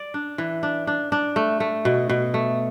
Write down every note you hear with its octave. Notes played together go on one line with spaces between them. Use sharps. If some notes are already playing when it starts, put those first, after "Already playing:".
Already playing: D5
D4
E3
D4
D4
D4
A3
A3
B2
B2
A3